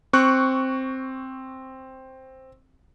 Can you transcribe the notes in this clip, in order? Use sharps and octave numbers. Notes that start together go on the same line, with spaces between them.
C4 C#6 F#6